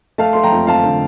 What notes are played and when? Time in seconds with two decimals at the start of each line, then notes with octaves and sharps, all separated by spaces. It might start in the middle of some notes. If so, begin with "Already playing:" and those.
0.18 A3 F5 A5
0.33 A3 C6
0.43 G5 A#5
0.52 F2
0.67 F2 F5 A5
0.83 D3